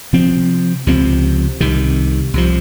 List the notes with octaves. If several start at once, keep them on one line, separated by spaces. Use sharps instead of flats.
C3 F3 C4
C#2 C3 F3 C4
C2 C3 D#3
C2 C3 F3